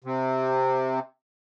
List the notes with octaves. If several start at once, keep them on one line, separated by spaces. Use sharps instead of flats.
C3